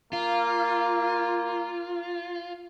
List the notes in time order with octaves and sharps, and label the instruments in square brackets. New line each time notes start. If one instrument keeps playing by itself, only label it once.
[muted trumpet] A#3 [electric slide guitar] F4